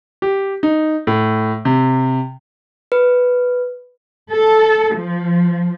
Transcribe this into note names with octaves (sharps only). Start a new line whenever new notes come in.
G4
D#4
A2
C3
B4
A4
F3